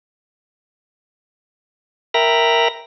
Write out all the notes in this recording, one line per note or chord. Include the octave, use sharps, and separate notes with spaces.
A#4 E5 G5 A#5 B5 A#6